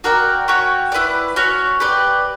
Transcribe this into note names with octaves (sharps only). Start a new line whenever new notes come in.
F#4 A#4 D5 G5
C#4 F#4 C#5 G5
E4 B4 D5
C#4 F#4 C#5
G4 B4 D5